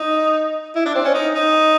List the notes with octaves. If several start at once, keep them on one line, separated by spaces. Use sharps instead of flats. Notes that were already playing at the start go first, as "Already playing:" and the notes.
Already playing: D#4
E4
D4
C4
C#4
D#4
D#4